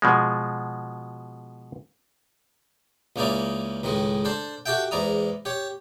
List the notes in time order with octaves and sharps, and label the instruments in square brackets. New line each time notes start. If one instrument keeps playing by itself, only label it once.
[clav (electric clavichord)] B2 F3 G#3
[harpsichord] C#2 A#3 C#4 D#4 E4 D5
C#2 A2 D#3 G#3
D4 A4 C5 A5
F#4 G4 A4 E5 G5
E2 G#2 E4 D5 A#5 D#6
G4 C#5